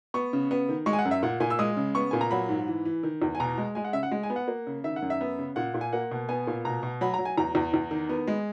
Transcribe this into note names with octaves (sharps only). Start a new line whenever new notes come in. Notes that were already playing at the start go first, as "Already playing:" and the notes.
B3 C#6
C#3
B3
D#3
G#3 C#6
G#5
F#5
F#2
E5
A#2 F#5
A#2 G#5
E6
G#3 D#6
C#3
B3 C#6
A#2 G#5
A#5
F#3 B5
G#2
E3
E3
D#3
E2
G#5
B2 A#5
G#3
G#3 G#5
F#5
C#3 E5
F#5
G#3
G#5
B3
F#5
A#3
C#3
D#3 E5
F#5
F#2
E5
B3
C#3
A#2 F#5
A#2
G#5
A#3 F#5
B2
B3 G#5
A#2
B2 A#5
B2
F#3 B5
A#5
F#3
G#5
E2 A#5
E2
E2
D#3
B3
G#3